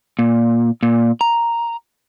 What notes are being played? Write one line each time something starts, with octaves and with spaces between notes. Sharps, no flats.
A#2
A#2
A#5